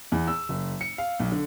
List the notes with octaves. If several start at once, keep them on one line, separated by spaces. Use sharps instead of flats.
E2
E6
F#1
C#7
F5
B1
D3